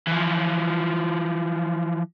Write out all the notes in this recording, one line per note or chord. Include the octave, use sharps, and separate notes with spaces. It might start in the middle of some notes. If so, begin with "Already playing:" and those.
E3 F3